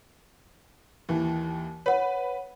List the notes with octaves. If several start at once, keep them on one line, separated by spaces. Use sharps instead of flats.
D#2 E3
B4 C#5 F#5